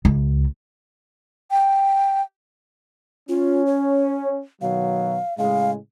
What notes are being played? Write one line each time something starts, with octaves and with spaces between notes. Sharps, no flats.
C#2
G5
C#4 F4
C#5
B2 D#3 F#3 F5
A2 C#3 G#3 F5